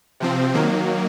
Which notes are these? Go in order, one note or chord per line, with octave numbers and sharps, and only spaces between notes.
C3 F3 C4
D#3 F#3 A#3